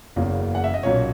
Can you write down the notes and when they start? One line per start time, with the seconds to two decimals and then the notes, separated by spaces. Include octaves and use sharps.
0.16 F#1 E2 C#3 E3 A#3
0.55 F#5
0.64 E5
0.74 D#5
0.83 B1 A#2 A#3 C#4 C#5